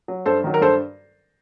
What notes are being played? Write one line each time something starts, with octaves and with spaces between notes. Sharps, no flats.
F#3
G2 A4 C5
D#3 F#3
A#4
G2 A4 C5